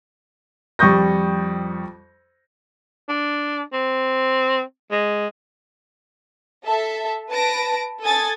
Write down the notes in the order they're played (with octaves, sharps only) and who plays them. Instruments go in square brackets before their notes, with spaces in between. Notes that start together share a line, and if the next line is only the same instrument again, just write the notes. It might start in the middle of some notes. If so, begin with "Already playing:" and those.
[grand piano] F2 G3 C#6 D#6 G6 A#6
[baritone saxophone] D4
C4
G#3
[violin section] A4 E5 A5
B4 A5 A#6 D7
A4 G#5 D#6 G#6 A6